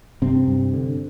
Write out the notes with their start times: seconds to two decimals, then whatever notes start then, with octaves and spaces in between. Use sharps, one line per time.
0.22 G2 C3 C4
0.48 G2
0.74 D3